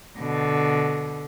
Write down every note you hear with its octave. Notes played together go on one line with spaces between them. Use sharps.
B2 D3